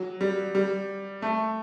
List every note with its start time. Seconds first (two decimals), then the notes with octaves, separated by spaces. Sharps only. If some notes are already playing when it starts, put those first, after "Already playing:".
Already playing: F#3
0.21 G3
0.55 G3
1.22 A3